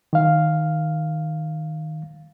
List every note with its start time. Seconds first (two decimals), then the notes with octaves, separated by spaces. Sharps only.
0.13 D#3 F5